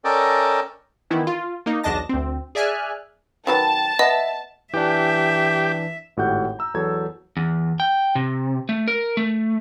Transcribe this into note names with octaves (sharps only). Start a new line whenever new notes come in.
C#4 A4 A#4 D5 D#5 G5
D#3 E3 B3 E4
F4
A#3 D#4
B1 E2 D4 D#5 A5 A#6
D2 C4
G#4 D5 E5 G#5 F6 F#6
D#3 F#3 B4 G5 A5
B3 D#5 E5
E3 D4 G4 E5
G#1 A2 F#4 G4 F#5 G6
A#5 E6
E2 F#3 A4 G#6
E2
G5
C3
A3
A#4
A3